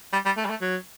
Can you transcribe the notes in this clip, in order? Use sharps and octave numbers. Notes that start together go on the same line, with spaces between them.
G3
G3
A3
G3
A3
F#3